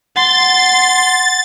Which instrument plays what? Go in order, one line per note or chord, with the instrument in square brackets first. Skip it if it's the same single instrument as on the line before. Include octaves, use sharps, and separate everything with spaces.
[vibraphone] F#5 [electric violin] C6 [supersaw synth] A6